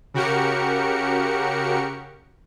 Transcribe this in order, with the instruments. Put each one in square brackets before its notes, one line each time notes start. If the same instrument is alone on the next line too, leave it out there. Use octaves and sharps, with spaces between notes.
[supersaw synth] C#3 F#4 G4 A#4 C#7